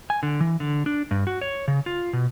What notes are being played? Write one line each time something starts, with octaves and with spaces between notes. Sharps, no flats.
G#5
D3
E3
D3
D4
G2
F#4
C#5
C#3
F4
B2